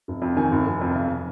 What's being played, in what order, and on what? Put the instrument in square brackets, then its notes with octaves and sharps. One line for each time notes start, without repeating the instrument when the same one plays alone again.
[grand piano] F1
F2
D#3 G#5
F1
F1
F2
B1